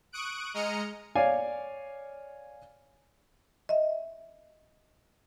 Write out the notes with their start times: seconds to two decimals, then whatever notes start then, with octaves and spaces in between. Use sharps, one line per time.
0.12 C#6 D#6 F#6 D7
0.54 G#3 D#5 A#5 D#6 F6 C#7
1.15 C#5 D5 F5 G#5
3.69 D#5 E5